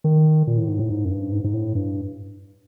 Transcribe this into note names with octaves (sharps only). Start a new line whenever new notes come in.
D#3
A#2
A2
G#2
A2
G#2
F#2
G2
G#2
G#2
A2
G2